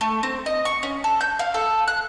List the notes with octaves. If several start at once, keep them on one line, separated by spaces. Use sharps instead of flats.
A3
C4
D#5
C#6
C#4
A4
G6
F5
A4
F#6